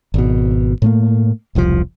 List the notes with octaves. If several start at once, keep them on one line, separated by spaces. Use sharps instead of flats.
G#1 B2
A2 A3 A#3
E1 C2 D3 F3